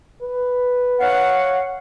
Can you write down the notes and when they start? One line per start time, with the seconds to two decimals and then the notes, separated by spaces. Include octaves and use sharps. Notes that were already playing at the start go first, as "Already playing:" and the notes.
0.22 B4
1.00 C#5 F5 F#5